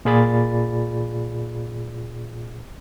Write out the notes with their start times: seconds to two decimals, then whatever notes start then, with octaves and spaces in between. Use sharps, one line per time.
0.05 A#2 F4 G#4 D5 B5 A6